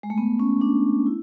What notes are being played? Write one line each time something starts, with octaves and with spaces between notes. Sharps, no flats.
G#3
A3
B3
C#4
D4
E4